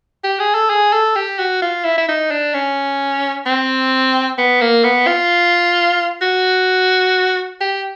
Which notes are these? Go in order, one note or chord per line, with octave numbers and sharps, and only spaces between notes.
G4
G#4
A4
G#4
A4
G4
F#4
F4
E4
E4
D#4
D4
C#4
C4
B3
A#3
B3
F4
F#4
G4